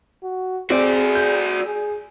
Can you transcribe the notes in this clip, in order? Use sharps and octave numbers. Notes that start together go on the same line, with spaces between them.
F#4
C4 F#4 G#4 D5
G6
G#4